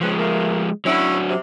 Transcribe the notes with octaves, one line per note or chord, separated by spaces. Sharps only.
F3 G#3 C4 C#4 B4
A3 A#3
F#3 C#4 D4 E4 F#4
C3